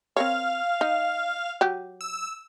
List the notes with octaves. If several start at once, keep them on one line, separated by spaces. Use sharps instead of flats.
C4 A#4 C#5 F5
D#4
F#3 G4
E6